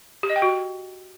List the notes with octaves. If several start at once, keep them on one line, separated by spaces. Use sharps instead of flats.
G4
D#5
G5
F#4